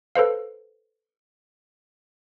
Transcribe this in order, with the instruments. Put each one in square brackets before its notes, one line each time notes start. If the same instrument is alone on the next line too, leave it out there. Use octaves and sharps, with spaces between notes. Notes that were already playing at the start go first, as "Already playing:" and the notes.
[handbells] A4 B4 C5 F5